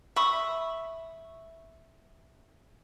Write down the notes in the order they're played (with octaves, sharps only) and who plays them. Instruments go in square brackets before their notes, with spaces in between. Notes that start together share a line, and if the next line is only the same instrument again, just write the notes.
[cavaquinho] E5 B5 C#6 D#6